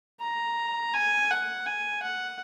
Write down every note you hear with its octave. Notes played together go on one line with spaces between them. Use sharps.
A#5
G#5
F#5
G#5
F#5